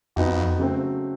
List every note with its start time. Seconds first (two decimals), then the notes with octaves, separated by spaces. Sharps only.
0.16 F2 B3 D#4 F#4
0.59 C#3 F#3 A3 C4